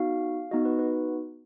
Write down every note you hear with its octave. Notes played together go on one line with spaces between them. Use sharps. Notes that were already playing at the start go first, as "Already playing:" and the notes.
Already playing: B3 D#4 F#4 F5
B3 D#4 F#4 D#5
B4
B4